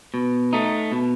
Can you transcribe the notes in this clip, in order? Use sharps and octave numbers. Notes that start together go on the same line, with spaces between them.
B2
A3 D#4
B2